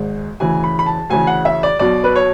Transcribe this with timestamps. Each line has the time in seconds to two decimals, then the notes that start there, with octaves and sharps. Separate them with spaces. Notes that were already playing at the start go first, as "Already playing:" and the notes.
Already playing: G#1 G#2 G#3
0.40 D2 C#3 E3 G#5
0.64 B5
0.79 B5
0.86 A5
1.10 D2 C#3 E3 G#5
1.27 F#5
1.45 E5
1.63 D5
1.79 B1 B2 F#3 D5
2.04 B4
2.15 C#5